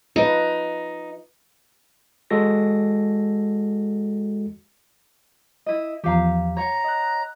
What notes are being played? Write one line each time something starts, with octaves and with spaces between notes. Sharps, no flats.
D#4 F4 B4
G#3 F#4 A4 A#6
E4 D#5
E2 F3 G4 F5 A#5
C#5 F#5 A#5
D#5 F#6